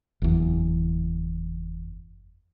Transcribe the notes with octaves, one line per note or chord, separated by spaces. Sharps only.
F#1 E2